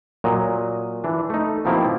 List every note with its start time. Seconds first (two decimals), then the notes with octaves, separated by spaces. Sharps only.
0.24 A#2 F#3 D#5
1.04 E3 D4
1.30 A3 D#4
1.65 B2 D#3 F3 A#3 C4 E4